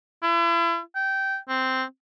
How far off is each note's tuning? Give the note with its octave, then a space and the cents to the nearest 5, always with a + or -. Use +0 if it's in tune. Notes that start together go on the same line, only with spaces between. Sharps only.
E4 +40
G5 -15
C4 -5